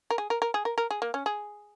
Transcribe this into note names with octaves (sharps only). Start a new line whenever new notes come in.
A#4
G#4
A#4
A#4
G#4
A#4
A#4
G#4
A#3
C#4
G#4